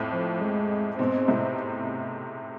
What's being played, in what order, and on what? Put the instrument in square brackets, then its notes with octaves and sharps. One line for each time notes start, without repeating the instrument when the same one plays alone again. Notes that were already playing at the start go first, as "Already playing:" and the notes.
Already playing: [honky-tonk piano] F2 A2
[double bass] F3
G#3
[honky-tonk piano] G#2 B2 [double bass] C4
[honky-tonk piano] A2 C3